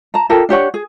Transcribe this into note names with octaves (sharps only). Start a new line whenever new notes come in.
A5 A#5
F4 G4 A4 A#4
D4 G4 C#5 F#5
G#4